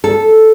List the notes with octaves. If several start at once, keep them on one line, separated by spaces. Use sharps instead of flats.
A4